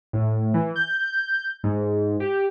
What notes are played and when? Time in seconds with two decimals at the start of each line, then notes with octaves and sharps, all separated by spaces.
0.13 A2
0.54 E3
0.76 G6
1.64 G#2
2.20 G4